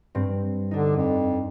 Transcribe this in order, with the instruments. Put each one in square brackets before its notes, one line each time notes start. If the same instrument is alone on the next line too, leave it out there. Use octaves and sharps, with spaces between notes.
[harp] G2 C4
[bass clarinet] D3 [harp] D4 D#4
[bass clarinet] F2